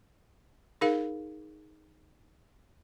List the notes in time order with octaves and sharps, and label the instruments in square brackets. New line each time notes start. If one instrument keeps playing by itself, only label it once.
[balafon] D#4 G#4 A#4 F5